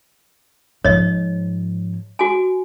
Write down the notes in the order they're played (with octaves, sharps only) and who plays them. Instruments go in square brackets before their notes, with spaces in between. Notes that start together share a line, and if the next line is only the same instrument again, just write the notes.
[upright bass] G#2 F3 [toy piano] C#5 D#5
[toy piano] F#4 G#5